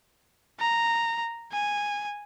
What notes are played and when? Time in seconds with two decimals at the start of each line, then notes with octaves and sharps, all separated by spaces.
0.59 A#5
1.52 G#5